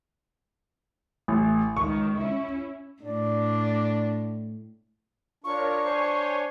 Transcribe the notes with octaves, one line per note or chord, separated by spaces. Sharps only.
A1
C#2 D#3 C#6
C#4 E4
A2 D4 D5
D4 F4 A#4 C#5 C#6
C5 C#5 G#5